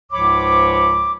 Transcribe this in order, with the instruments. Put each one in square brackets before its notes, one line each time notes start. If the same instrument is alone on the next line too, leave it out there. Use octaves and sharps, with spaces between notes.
[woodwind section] C#2 G#2 F3 C#5 B5 D6